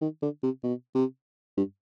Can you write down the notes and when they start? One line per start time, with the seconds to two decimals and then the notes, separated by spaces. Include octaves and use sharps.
0.01 D#3
0.22 D3
0.43 C3
0.63 B2
0.95 C3
1.57 G2